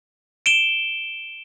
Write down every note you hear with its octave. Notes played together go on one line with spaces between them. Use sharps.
D7 E7 G7